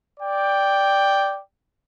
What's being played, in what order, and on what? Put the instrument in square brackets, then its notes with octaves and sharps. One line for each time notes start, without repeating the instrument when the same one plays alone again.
[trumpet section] D5 G5